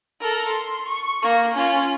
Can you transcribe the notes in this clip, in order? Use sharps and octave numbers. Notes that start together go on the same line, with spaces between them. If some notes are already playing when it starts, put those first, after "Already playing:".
A4 A#4
C6
C#6
A#3
C#4 F4